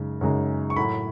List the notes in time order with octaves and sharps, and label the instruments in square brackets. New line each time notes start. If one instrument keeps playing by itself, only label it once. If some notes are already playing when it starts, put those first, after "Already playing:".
Already playing: [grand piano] F#2 C#3 G#3 D#4
F#2 C#3 G#3 D#4
C#6
A2 F#3 A3 B5